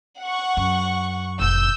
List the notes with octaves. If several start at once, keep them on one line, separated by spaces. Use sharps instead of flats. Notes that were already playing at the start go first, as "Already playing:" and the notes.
F#5 C#6
F#2
F1 A#1 E6 G6